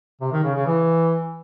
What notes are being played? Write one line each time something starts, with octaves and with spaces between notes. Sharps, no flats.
C3
D#3
C#3
C#3
E3